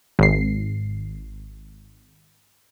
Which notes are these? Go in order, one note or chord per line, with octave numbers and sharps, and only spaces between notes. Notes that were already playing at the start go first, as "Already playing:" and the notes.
G#1 C7